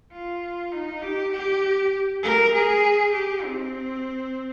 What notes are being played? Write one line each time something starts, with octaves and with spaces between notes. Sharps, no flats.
F4
D#4
G4
G4
A#4
G#4
G4
C4